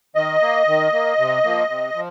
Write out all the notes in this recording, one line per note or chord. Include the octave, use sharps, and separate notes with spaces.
D#3 D#5
A#3
D#3
A#3
C3
F3 A#3
C3
F3